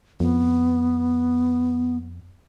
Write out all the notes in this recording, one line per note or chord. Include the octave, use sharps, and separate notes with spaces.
F2 B3